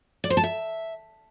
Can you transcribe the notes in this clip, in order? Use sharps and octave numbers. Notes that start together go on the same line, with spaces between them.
D5
C5
A5
E5